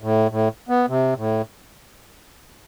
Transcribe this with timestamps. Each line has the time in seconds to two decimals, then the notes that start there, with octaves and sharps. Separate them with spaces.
0.02 A2
0.31 A2
0.69 B3
0.88 C3
1.17 A2